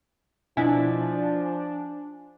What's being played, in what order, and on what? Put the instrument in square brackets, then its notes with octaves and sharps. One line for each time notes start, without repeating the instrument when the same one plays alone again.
[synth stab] B2 E4 [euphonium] F3 [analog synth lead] D4 [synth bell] G#5